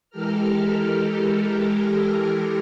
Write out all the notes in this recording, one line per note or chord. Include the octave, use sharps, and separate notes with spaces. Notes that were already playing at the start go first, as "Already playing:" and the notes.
E3 G#3 G4 A4 A#4 F6